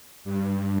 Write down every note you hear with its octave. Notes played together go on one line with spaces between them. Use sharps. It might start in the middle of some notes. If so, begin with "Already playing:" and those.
G2